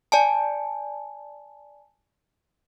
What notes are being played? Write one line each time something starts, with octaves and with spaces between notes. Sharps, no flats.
D5 G#5 A5